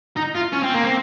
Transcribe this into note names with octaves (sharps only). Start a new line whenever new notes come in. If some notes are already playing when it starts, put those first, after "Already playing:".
D#4
F4
C#4
C4
A#3
C4